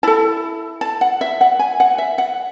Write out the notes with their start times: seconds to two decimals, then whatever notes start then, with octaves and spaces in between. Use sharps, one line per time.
0.03 E4 A4 A5
0.81 A5
1.01 F#5
1.21 E5
1.41 F#5
1.59 G#5
1.80 F#5
1.98 E5
2.18 F#5